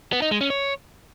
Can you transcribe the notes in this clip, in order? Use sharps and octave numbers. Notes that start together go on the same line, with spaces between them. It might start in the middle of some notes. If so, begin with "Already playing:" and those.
B3
D#4
G#3
C#4
C#5